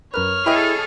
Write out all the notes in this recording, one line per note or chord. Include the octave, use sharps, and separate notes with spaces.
F#2 A#4 B4 C#5 F6
E4 G#4 A4 D#5 G5 B5